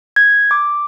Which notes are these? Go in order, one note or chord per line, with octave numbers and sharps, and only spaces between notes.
G#6
D6